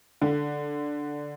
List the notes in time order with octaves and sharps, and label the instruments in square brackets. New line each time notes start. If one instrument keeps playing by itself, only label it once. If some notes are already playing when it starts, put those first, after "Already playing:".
[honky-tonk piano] D3